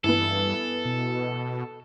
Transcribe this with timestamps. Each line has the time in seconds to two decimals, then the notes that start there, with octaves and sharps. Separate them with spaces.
0.04 G2 E3 B3 A4
0.85 B2